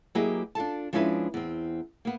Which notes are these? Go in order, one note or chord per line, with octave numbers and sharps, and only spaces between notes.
F#3 A#3 E4 G4 G#4 D#5
D4 F4 A4 A5
F3 G#3 C#4 D4 E4 B4
E2 C4
A#3 B3